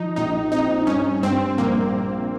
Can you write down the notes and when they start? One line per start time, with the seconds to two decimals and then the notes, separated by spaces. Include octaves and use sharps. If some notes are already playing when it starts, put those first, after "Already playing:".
Already playing: F3 D#4
0.16 A#1 D#4
0.52 C4 D#4
0.87 G2 C#4
1.23 G2 C4
1.58 A#1 A#3